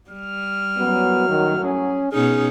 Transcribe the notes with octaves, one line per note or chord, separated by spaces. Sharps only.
G3 F6
F#2 A2 F#3 B3
D#3
C#4 G#4
B2 C#4 D#4 G#4 F6